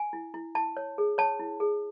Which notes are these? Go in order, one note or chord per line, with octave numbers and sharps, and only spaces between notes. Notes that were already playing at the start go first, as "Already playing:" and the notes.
Already playing: G#5
E4
E4
E4 A5
C#5
G#4
C#5 A5
E4
G#4